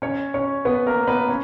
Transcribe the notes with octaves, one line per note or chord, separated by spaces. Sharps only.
C#4 C#5
C#4 C#5
B3 B4
A#3 A#4
B3 B4
C#4